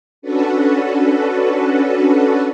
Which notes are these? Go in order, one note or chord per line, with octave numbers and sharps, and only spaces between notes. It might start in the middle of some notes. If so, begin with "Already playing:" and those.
C#4 D4 F#4 A4 B4